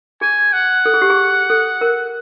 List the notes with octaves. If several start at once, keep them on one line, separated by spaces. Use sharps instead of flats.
G#4 G#5
F#5
A4
G#4
G4
G#4
A4
A#4